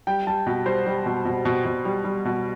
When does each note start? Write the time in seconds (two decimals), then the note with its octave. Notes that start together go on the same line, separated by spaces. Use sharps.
0.07 G3 G5
0.27 G3 A5
0.47 B2
0.66 G3 C5
0.86 G3
1.06 B2
1.25 B2
1.45 B2
1.65 B2
1.85 G3
2.04 G3
2.25 B2